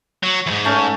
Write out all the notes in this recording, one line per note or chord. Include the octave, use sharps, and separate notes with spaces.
F#3
E2 G#2
A3 C#4